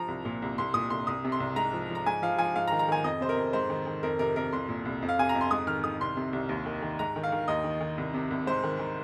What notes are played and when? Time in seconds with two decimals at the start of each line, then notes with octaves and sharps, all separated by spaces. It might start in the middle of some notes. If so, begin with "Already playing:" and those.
Already playing: F3 A#5
0.08 C2
0.25 A#2
0.42 C2
0.58 C2 C6
0.74 A#2 D#6
0.90 C2 C6
1.07 C2 D#6
1.24 C3
1.32 C6
1.40 C2
1.56 G#2 A#5
1.73 F3
1.90 F3
1.95 A#5
2.06 G#2 G#5
2.22 F3 F5
2.38 F3 G#5
2.56 G#2 F5
2.68 A#5
2.72 D#3
2.79 A#5
2.88 D#3 G#5
3.04 F2 D#5
3.21 C3 C5
3.29 A#4
3.37 F2
3.53 G#2 C5
3.70 D#3
3.87 D#3
4.03 F2 A#4
4.19 C3 A#4
4.36 F2 A#4
4.53 C2 C6
4.68 A#2
4.85 C2
5.02 F2
5.09 F5
5.19 C3 G#5
5.29 A#5
5.35 F2
5.41 C6
5.51 G#2 D#6
5.67 D#3 F6
5.84 D#3 D#6
6.01 C2 C6
6.17 C3
6.33 C2
6.49 D#2
6.66 D#3
6.82 D#3
6.99 G#2 A#5
7.16 D#3
7.24 F5
7.32 D#3
7.48 D#2 D#5
7.64 D#3
7.81 D#3
7.98 C2
8.14 C3
8.31 C2
8.46 G#2 C5
8.64 D#3
8.79 D#3